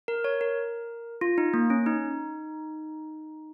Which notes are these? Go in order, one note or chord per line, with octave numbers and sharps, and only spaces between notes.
A#4
C#5
A#4
F4
D#4
A#3
C#4
D#4